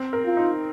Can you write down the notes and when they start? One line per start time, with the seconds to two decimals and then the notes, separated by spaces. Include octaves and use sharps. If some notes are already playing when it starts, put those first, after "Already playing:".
Already playing: C4
0.13 A#4
0.25 F4
0.37 D#4